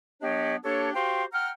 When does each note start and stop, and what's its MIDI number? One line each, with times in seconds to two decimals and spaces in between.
0.21 0.56 54
0.21 0.56 59
0.21 0.56 62
0.21 0.56 67
0.21 0.56 73
0.21 0.56 75
0.63 0.90 58
0.63 0.90 62
0.63 0.90 67
0.63 0.90 69
0.63 0.90 73
0.94 1.24 66
0.94 1.24 67
0.94 1.24 72
0.94 1.24 77
0.94 1.24 79
0.94 1.24 84
1.32 1.49 78
1.32 1.49 79
1.32 1.49 82
1.32 1.49 89